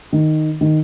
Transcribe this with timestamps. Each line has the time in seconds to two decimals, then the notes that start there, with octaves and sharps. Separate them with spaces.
0.13 D#3
0.61 D#3